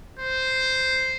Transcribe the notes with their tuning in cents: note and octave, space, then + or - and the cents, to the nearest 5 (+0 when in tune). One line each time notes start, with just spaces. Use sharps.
C5 -5